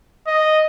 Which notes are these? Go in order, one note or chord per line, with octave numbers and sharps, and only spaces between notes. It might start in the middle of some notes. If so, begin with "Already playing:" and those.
D#5